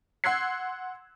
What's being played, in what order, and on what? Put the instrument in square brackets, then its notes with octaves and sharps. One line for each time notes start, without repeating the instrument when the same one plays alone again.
[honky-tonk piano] F#5 C6 E6 F#6 G#6 C7